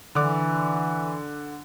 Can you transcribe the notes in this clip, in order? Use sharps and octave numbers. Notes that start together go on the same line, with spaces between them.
D3 E3 D5 D6